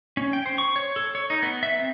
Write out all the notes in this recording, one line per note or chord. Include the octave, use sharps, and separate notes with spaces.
C#4
G5
C5
C#6
C#5
A4
C#5
D#4
B3
E5
C4